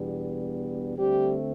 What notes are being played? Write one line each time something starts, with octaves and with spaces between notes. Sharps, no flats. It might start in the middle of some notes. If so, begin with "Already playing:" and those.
Already playing: E2 B2 G3 B3 D4
D2 D3 G3 A3 C4 G4